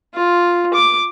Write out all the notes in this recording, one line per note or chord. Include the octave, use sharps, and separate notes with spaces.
F4
D6